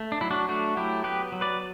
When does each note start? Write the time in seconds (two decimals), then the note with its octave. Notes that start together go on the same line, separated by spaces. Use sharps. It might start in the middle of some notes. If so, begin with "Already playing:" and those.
Already playing: A3
0.12 D4
0.21 F#3 E4
0.31 D4 F#4
0.49 A3 D4 F#4
0.77 F#3 E4 G4
1.04 B3 G4 B4
1.32 F#3
1.41 B4 D5